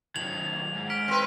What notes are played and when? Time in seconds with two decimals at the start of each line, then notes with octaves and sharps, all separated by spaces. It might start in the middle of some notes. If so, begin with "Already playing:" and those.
0.16 D#3 F#3 G#6 F7 F#7
0.75 G#2
0.90 F6 B6 D7
1.08 C4 B4